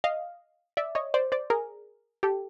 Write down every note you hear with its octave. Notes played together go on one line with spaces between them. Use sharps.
D#5 F5
D5 E5
C#5 D#5
C5 D5
C5 D5
G#4 A#4
G4 A4